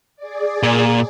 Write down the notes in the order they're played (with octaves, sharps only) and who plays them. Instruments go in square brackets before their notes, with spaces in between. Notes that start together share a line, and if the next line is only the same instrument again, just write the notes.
[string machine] G#4 D5
[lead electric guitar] A#2